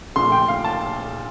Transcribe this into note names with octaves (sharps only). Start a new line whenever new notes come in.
A#1 A#2 A3 C6
G5
F5
A5